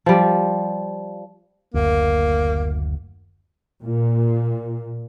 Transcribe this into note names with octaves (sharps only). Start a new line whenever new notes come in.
F3 G3
F#1 D2 A#3
A#2